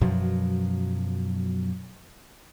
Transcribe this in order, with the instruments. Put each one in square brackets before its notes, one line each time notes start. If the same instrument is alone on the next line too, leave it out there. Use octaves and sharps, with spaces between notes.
[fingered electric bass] F#2 B2 F3 F#3